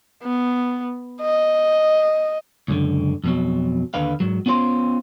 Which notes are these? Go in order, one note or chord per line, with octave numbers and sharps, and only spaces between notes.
B3
D#5
C#2 F#2 D3
F2 B2 F#3
D#2 D3 B4 F5
G#2 F#3
B3 C#4 F4 C5 C6